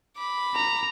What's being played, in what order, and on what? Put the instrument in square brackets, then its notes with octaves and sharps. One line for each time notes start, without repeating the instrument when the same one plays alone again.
[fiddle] B5 D6
[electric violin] A#5